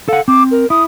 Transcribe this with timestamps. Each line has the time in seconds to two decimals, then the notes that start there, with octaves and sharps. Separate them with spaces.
0.08 A4 F5 F#5
0.28 C4 D6
0.51 A#4
0.70 E4 D#6